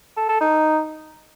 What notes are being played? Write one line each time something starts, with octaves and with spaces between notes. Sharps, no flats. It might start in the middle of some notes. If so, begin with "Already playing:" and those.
A4
A4
D#4